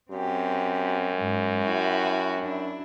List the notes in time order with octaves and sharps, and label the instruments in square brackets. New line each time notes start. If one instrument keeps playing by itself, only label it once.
[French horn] F#2 [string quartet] C4 G4
[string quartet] G#2
E4 F#4 G4
D4 E4